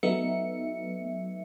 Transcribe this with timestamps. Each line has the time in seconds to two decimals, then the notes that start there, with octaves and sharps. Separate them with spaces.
0.03 F#3 A3 B3 D#4 E5 C#7